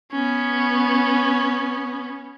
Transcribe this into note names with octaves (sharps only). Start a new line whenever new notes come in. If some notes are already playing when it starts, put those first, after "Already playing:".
B3 C#4